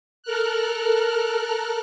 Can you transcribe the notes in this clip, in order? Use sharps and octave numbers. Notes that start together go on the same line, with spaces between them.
A4 A#4 F6 F#6